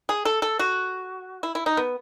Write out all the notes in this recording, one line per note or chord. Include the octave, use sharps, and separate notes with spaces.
G#4
A4
A4
F#4
E4
E4
D#4
B3